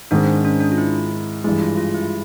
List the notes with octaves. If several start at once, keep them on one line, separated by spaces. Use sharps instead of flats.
G#2 D#3 G#3 C4 D4
D4
C#4
D4
F4
E4
G2 E3 G#3 E4
F4
F4
E4